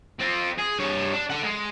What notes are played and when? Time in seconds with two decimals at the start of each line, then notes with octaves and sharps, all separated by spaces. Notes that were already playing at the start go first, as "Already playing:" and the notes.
0.19 C4 F4
0.58 G#4
0.79 G2 C#5
1.13 D4
1.30 A4 F#5
1.43 G#3